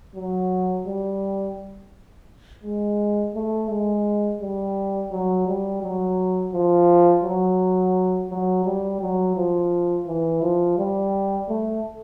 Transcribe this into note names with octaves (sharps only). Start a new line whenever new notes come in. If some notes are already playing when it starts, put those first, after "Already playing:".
F#3
G3
G#3
A3
G#3
G3
F#3
G3
F#3
F3
F#3
F#3
G3
F#3
F3
E3
F3
G3
A3